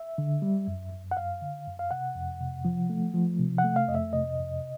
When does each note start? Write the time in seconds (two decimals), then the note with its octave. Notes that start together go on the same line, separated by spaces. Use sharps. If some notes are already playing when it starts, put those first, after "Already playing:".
Already playing: E5
0.18 D3
0.42 G3
0.68 F#2
0.92 F#2
1.11 F#5
1.17 F#2 F5
1.41 D3
1.67 F#2
1.79 F5
1.91 C3 F#5
2.15 F2
2.41 C3
2.65 F3
2.90 A3
3.14 F3
3.39 C3
3.58 F#5
3.64 A3
3.76 F5
3.88 F2 D#5
3.95 E5
4.13 C3 D#5
4.38 F2